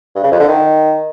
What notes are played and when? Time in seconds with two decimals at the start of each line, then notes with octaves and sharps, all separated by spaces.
0.15 G2
0.23 C#3
0.32 F2
0.40 D3
0.48 D#3